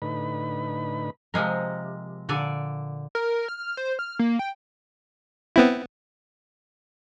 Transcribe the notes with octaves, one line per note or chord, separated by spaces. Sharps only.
A2 D3 D#4 B4 B5
C3 F3 G#3 A#4
A#2 D3 D5 G#5
A#4
F6
C5
F6
A#3
G5
B3 C4 E4